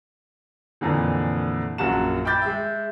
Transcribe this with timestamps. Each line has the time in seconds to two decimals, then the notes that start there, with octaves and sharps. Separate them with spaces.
0.81 F2 A#2 D3 E3
1.78 A#1 F#2 A#3 F#4 A5 E7
2.25 G5 B5 D6 G6 A6
2.42 G#3 E5